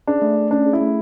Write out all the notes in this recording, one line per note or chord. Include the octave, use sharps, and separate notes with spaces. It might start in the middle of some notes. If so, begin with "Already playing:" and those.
D4 G#4
A3
A3
C#4 D4
G#4
E4
A3